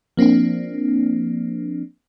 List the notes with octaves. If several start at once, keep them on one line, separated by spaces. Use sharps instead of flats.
F3 A#3 C4 D4